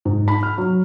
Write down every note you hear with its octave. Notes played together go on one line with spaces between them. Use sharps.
G#2
B5
F6
F#3